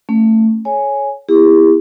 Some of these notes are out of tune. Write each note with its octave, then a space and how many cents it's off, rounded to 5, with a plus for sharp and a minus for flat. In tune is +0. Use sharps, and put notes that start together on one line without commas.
A3 +15 C#4 -15
A4 -45 C#5 +0 G#5 +0
B3 +0 E4 +0 G4 +45